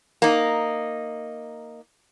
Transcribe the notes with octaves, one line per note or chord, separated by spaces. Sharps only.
A#3 D#4